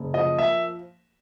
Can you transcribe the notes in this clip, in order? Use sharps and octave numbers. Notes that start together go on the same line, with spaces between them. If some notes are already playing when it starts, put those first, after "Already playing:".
Already playing: F#1
F3 D#5
A#3 E5